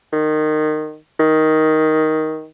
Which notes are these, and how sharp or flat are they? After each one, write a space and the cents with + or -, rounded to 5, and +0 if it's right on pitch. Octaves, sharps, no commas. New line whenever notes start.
D#3 -20
D#3 +10